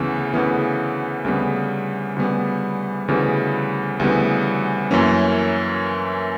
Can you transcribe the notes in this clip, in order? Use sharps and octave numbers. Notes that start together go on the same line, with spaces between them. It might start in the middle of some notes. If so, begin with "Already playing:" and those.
Already playing: D2 C#3 E3 B3
D2 C#3 E3 B3
D2 C#3 G3 B3
D2 C#3 G3 B3
D2 C#3 E3 G3 B3
D2 C#3 E3 G3 B3
F#2 E3 A#3 C#4